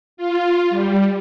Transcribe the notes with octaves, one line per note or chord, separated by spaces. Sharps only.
F4
G3